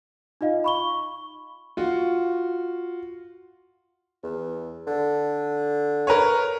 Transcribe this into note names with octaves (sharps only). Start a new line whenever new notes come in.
D#4 F4 D#5 F5
B5 C#6 G7
F4 F#4
E2
D3
A#4 B4 C#5